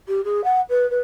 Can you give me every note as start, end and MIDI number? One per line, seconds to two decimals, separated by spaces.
0.08 0.21 67
0.24 0.44 68
0.44 0.60 78
0.69 0.88 71
0.90 1.00 71